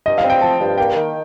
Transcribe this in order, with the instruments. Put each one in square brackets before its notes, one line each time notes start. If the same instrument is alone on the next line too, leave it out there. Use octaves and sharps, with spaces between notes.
[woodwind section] G2 [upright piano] D#5
[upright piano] F5
[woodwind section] C4
[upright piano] G5
[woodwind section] F3 [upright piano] A5
[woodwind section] G2
[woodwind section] A#3 [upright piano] G5
[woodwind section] D#3